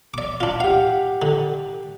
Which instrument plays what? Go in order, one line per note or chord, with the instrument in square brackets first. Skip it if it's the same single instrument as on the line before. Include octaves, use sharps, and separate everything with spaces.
[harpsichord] D5 D6
D4 F4
[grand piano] G4 F#5 [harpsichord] F5
[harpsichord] D3